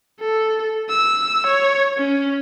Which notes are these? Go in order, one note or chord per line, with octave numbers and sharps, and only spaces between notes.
A4
E6
C#5
C#4